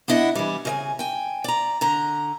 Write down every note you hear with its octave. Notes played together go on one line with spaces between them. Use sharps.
B3 D4 E4 D#5 F#5
E3 G3
C#3 D#5 G#5
G5 G#5
D5 A#5
D3 A#5